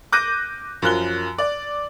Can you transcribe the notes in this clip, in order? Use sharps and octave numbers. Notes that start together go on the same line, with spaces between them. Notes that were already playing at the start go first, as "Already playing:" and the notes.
D6 F#6 G6 A#6 D#7
F#2 F3 F#6 G7
D5